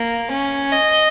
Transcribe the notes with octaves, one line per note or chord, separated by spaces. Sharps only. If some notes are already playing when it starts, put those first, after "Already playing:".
Already playing: A#3
C#4
D#5